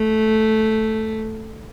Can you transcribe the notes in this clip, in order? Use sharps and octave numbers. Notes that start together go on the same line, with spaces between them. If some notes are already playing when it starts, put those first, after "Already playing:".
Already playing: A3